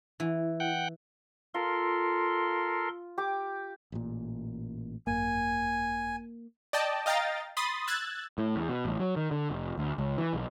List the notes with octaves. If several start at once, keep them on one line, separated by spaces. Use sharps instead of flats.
E3 E4
F#5 G5
F4 A4 A#4 C6
G4 D6
A1 A#2
G#1 F#2 A#3 G#5
D5 D#5 G5 A5
D#5 F5 G5 A#5 A6
B5 C6 D#6 A6
E6 F#6 G#6 A6
A2
E2
B2
A1
F#3
D#3
D3
F1
D2
C#2
E3
B1